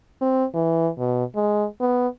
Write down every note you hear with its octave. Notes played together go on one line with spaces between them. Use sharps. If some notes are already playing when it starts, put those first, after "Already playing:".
C4
E3
B2
G#3
B3